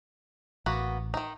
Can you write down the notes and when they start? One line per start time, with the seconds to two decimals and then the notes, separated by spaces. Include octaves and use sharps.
0.66 A1 A#3 B3 F#4
1.14 D#3 D#4